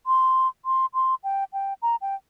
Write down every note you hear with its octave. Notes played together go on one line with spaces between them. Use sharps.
C6
C6
C6
G5
G5
A#5
G5